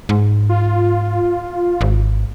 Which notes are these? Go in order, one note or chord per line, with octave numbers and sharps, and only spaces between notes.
G#2
F4
G#1